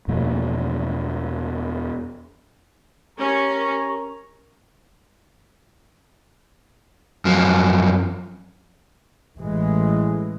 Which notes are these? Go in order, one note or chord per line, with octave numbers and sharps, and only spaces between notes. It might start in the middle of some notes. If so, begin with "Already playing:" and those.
E2 B2 F3 A#3
C#4 G4 A#4 A#5 C#6
F#2 F3
A1 E3 G#3